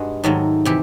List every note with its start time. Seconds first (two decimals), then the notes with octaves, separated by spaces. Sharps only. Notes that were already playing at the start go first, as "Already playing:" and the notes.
Already playing: G2 G#3 F#4
0.24 G#2 D#3 F#3 A3
0.65 C3 E3 G4